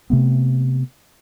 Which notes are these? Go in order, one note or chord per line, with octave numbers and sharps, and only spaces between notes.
C3 A3 B3